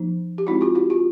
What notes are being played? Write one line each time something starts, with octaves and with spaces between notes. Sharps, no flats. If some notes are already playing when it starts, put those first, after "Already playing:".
Already playing: F3 A#3 D#4
G4
G#3 C4 D#4 E4 F#4
F4 G4
E4 F#4
F4 G4